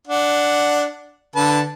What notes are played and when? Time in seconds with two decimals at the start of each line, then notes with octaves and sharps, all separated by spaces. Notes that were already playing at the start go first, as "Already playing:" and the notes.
0.08 D4 F#5
1.36 D3 B4 A5